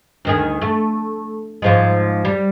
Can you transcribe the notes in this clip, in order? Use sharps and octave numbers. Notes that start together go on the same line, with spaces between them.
D2 D#3 G#4
A3
G#2 F3 G#3
G3